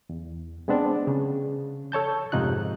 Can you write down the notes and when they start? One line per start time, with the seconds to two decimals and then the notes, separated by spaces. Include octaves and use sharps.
0.09 E2
0.68 G#3 B3 C4 D4
1.07 C#3
1.92 A4 C#5 A5 G6
2.32 F2 G#2 C3 D#4 F4 F#6